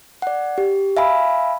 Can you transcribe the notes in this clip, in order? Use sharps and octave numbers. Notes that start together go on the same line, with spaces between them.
D5 F#5
G4
E5 F5 G#5 B5